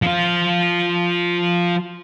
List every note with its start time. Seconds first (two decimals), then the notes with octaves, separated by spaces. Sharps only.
0.02 F3 F4